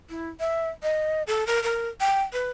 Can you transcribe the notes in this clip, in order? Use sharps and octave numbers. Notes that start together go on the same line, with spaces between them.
E4
E5
D#5
A4
A#4
A#4
G5
B4